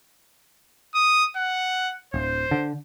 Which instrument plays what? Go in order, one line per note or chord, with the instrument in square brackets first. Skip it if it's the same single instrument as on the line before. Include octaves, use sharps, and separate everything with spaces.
[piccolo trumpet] D#6
F#5
[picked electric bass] D1 [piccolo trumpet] C5
[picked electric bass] D3